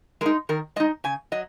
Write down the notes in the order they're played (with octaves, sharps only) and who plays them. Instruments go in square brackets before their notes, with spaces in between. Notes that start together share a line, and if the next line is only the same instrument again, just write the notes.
[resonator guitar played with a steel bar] G#3 A#4
D#4
D#3 A#4
G#3 D#5
D#4
C#3 G#5
F#3 D#5